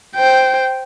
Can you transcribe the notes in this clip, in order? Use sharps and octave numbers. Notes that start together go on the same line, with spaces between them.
C5 G5